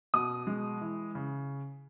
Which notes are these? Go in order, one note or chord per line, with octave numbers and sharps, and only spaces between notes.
B2 D#6
G#3
E3
C#3